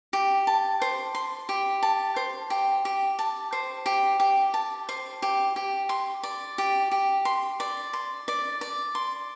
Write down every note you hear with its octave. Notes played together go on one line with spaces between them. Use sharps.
G4
A5
C5
C6
G4
A5
C5
G4
G4
A5
C5
G4
G4
A5
C5
G4
G4
C6
D5
G4
G4
C6
D5
C6
D5
D5
C6